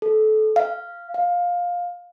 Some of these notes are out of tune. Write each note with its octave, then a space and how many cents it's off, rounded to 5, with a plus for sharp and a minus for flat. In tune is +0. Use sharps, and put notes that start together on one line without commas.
A4 -25
F5 -10
F5 +15